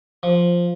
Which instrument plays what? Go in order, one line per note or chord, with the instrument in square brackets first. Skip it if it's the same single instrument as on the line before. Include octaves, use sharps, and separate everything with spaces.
[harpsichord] F3